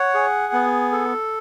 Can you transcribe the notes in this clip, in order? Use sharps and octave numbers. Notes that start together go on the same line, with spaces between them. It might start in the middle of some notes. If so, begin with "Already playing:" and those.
Already playing: C#5 F#5
G#4
B3
A4